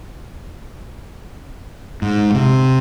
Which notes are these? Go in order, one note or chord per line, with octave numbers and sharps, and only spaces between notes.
G#2
C3